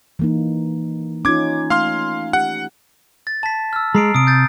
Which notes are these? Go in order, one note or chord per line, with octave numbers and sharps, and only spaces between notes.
E3 A#3 D#4
C#4 D#4 F4 D6 G#6
A3 F5 C6 F6
G4 F#5
A6
A5 B6
E6 F6
G#3 A#5 C7 D7
C3 D#6 D7
G6 A6